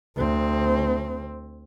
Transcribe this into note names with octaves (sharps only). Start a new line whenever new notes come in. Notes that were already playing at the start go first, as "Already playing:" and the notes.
D2 C4